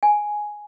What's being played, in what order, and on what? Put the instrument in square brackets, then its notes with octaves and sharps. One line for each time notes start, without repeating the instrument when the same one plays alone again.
[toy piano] G#5